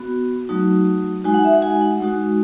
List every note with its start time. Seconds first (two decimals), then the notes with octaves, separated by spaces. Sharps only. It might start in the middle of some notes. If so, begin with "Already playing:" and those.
Already playing: B3 F#4
0.49 F#3 A3 D#4 F#4
1.24 G#3 D#4 F#4 G#5
1.34 F#5
1.44 E5
1.53 F#5
1.62 G#5
1.81 F#5
2.00 G#3 D#4 F#4